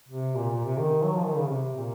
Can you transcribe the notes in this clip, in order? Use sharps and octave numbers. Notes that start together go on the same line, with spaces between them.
C3
A#2
A#2
C3
D#3
F#3
F3
D#3
C#3
C3
A#2